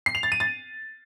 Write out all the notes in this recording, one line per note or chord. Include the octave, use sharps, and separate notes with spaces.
C7
F7
A6
D#7
A6